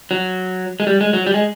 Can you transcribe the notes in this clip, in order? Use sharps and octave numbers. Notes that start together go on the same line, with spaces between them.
F#3
G#3
G3
G#3
F#3
G3
G#3